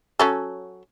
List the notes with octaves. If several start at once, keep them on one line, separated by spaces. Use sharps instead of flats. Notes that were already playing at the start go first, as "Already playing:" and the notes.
F#3 C#4 A4